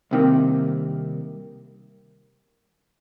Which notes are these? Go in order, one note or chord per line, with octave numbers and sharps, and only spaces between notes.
C2 C3 D#3 A#3